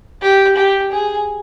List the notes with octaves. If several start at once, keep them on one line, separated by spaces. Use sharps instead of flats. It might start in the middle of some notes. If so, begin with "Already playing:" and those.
G4
G4
G#4